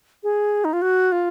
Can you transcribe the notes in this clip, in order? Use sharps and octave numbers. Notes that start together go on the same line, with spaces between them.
G#4
D#4
F4
F#4
F4